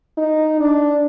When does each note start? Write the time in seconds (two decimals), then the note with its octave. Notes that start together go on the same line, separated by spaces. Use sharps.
0.17 D#4
0.60 D4